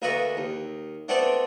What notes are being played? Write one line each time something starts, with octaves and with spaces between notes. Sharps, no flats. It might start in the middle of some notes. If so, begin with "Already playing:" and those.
D2 A#3 A4 B4 D#5 C#6
D#2
A3 B3 C4 D4 A4 D5